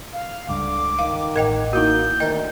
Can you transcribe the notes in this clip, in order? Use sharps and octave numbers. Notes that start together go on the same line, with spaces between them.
F5
C#2 G2 D3 D6
D#3 F5
A1 A#4 D#5 F#5 G5
A#3 D#4 E4 F#4 G6
D2 D#3 A#4 D#5 G5